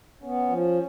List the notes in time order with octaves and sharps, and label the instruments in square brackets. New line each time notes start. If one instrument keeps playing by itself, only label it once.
[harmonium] B3 [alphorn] C#4
[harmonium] F3